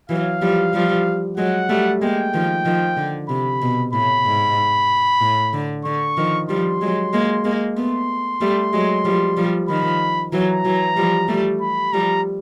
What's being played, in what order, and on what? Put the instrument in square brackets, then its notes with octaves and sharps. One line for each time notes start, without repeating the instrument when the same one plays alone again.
[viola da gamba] E3 F#3 [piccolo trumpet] F5
[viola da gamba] F3 G3
F3 G3
[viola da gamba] F#3 G#3 [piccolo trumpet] F#5
[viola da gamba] G3 A3
[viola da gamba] G#3 A#3 [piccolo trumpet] G5
[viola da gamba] D#3 F3
D#3 F3
D3
[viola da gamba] C3 [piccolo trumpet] B5
[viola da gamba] B2
[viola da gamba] A2 [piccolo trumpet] B5
[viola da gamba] G#2
A2
D3
[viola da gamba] D3 [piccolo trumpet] C#6
[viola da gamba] D#3 F3
[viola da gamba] F3 G3 [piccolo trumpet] C6
[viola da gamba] F#3 G#3
G#3 A#3
G#3 A#3
[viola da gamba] A3 B3 [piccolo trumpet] C6
[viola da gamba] G3 A3
F#3 G#3
F3 G3
F3 G3
[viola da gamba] D#3 F3 [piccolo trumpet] B5
[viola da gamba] E3 F#3 [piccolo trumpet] A#5
[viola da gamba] E3 F#3
F3 G3
G3 A3
[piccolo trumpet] B5
[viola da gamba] F3 G3 [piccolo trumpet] A#5